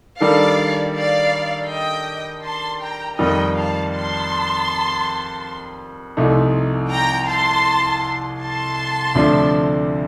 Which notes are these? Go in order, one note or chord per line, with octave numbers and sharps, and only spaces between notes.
D#3 G3 D4 A4 D5 F5
D5 F5
D#5 G5
A5 C6
G5 A#5
F2 D#3 G3 D#5 G5
F5 A5
A5 C6
C2 C3 F3 A3 D#4
G5 A#5
A5 C6
A5 C6
D2 C3 F3 A3 D4